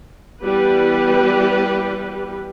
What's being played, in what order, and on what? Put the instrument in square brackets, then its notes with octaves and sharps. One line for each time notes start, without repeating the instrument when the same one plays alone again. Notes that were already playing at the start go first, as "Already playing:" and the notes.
[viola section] E3 G3 B3 G4 B4